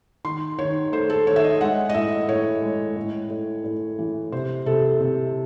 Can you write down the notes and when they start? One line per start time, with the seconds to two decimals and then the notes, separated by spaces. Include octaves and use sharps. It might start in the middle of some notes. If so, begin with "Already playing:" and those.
0.25 D#3 C6
0.58 D#3 C#5
0.92 A3 C5
1.10 A4
1.27 D#3 C#5
1.36 E5
1.44 D#5
1.61 G#3 F#5
1.89 D#5
1.94 A2 E5
2.28 A2 C#5
2.62 G#3
2.96 A2
3.30 A2
3.64 A2
3.99 E3
4.32 C3 C5
4.66 C3 A4
5.00 C3